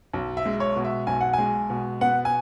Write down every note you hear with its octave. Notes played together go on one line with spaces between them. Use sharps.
B1
E5
G#3
C#5
B2
E5
B1 G#5
F#5
G#3 G#5
B2
B3 F#5
G#5